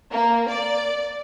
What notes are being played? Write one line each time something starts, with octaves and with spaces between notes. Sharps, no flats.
A#3
D5